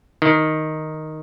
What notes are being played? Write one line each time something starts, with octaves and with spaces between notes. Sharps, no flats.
D#3